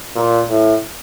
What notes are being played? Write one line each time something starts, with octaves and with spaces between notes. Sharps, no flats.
A#2
A2